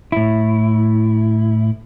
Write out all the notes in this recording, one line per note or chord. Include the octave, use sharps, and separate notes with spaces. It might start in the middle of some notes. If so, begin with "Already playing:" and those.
A2 E4